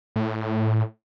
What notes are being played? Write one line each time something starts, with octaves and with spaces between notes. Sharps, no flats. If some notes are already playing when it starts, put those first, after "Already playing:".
A2